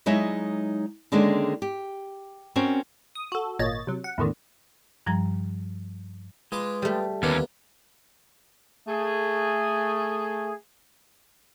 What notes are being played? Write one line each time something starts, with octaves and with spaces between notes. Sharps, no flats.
F#3 G#3 D#4 E4 C#5 E5
D3 D#3 G#3 A#3 C#4 D4
G4
C4 C#4 F#4 A#4 C5
D#6
F#4 A4
G#1 A#2 A#3 C#5 D#5 A6
C3 F#3
F#5
E2 A2 D3 D#3
G2 F3 G3 A#5
G#3 F4 B4 D6
G3 A3
D#2 D3 A#3 B3 C#4 D4
A3 G#4